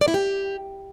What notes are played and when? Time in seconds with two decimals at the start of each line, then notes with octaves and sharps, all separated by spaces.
0.01 D5
0.08 E4
0.14 G4